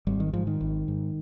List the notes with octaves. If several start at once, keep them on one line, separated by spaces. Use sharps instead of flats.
G#1 G3
D#3
G#2 F3
D#3
G#1
G#2